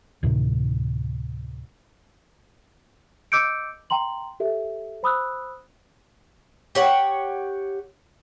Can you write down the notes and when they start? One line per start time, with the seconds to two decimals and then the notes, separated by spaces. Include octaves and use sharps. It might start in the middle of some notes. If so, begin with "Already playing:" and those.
0.23 D2 A2 C3 D#3
3.32 D#5 D6 E6 G6 C#7 D7
3.90 G5 A#5 C6 F#7
4.40 G4 A4 E5
5.03 C5 B5 D#6 E6 F#6
6.75 G4 C#5 F#5